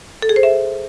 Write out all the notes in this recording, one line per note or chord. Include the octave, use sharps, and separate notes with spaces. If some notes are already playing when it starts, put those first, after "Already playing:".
A4
G#4
C5
E5